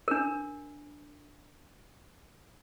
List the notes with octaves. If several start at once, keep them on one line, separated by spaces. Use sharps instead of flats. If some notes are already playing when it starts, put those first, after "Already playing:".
D4 A#4